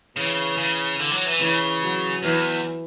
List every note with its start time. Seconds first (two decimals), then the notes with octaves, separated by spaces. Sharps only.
0.17 C#3 E3
0.57 C#3
0.99 D3
1.12 F#3
1.27 E3
1.40 C#3 E3
1.82 F#3
2.23 E2 E3